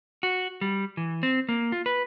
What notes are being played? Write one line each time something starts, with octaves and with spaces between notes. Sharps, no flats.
F#4
G3
E3
C4
A#3
F4
B4